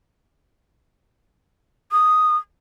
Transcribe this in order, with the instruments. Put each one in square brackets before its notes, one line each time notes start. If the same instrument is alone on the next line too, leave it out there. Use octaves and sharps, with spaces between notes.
[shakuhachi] D#6